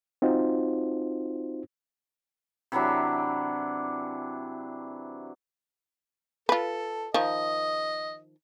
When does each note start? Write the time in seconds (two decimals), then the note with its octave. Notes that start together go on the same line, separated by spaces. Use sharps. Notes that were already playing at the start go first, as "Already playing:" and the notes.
0.22 C4 D#4 F4 F#4 C5
2.72 C3 E3 F#3 D4
6.49 F4 A4 B4
7.14 D#3 F3 D#5